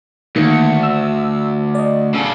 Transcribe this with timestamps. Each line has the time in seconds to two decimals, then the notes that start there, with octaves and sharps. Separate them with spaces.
0.36 D2 D#3 A#3 C#7
0.83 E6
1.75 D5 D#5
2.14 C#3 A4